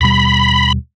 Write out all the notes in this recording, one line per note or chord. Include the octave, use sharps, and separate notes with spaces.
D#2 B2 G3 B5